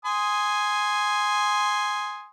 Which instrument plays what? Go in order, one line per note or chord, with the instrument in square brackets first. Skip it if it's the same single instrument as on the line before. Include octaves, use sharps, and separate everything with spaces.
[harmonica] G#5 C6 D#6